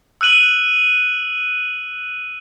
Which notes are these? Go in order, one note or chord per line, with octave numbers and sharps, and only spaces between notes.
E6 F#6 D#7 F#7